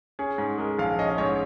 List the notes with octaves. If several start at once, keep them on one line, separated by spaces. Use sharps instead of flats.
C#4 G#4
G#2
G#3 A#4
A#1 F5
C#4 D#5
D#5
G#2 C#5